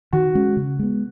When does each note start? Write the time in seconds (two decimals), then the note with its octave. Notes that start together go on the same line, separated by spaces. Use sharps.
0.13 D#3 F#4
0.35 G#3 C#4
0.57 C#3
0.79 G#3 B3